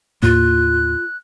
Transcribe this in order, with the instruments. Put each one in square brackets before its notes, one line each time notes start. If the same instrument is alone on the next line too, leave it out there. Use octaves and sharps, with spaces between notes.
[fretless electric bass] D#2 A2 A#3 [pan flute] F4 [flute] F#6